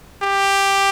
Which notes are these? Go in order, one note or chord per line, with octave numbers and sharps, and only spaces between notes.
G4